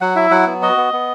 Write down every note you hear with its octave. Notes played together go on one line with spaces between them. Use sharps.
F#3 F#5
E4 E5
F#3 F#5
B3
F#4 D#5
B3
B3